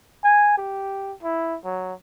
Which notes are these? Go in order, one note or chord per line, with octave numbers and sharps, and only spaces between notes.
G#5
G4
E4
F#3